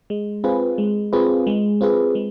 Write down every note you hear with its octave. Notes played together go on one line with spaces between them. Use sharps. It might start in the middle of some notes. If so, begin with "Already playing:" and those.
G#3
C4 F4 G#4 B4
G#3
C4 F4 G#4 B4
G#3
C4 F4 G#4 B4
G#3